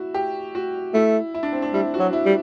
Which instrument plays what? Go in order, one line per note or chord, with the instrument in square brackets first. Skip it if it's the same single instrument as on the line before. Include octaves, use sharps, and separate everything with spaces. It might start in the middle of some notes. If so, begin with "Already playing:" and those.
Already playing: [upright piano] E4 F#4
G4
F#4
[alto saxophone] A3 [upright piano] E4
[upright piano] E4
D4
C4
D4
[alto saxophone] G3 [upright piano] E4
[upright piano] F#4
[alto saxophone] F#3
[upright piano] E4
[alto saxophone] G3